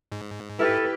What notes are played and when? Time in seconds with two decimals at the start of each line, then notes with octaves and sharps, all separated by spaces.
0.12 G#2
0.59 E4 G4 A4 B4 F6